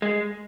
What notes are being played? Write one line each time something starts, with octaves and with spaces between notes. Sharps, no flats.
G#3